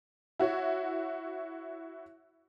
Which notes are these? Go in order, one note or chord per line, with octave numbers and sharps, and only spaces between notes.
E4 F#4 C#5